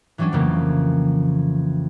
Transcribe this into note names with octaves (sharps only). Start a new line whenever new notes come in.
E3 F#3 G3 C#4 D4
F2 C#3 E3 A3 A#3